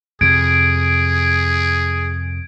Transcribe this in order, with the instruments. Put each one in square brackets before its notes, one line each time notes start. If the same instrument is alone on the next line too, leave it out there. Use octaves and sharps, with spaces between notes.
[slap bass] F2 C3 [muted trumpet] G#4 [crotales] G#6 D7